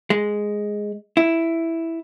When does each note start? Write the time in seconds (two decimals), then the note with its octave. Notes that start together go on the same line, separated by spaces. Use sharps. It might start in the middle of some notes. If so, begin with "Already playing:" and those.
0.10 G#3
1.17 E4